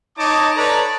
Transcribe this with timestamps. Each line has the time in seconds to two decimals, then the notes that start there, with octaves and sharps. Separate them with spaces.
0.17 D#4 C#5 D#5 A5 D6
0.55 A4 B4 C#5 D5 A5 A#5